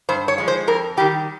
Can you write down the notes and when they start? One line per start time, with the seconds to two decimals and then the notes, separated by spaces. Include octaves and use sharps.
0.09 G2 C5
0.28 C#5
0.38 F3 G#3
0.48 C5
0.67 F2 A#4
0.97 D#3 G3 G4